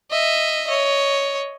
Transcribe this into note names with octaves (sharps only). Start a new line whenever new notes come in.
D#5 E5
C#5 D#5